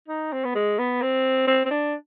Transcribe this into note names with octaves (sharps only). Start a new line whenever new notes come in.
D#4
C4
B3
G#3
B3
C4
C4
C4
D4